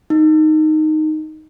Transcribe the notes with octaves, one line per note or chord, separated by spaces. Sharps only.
D#4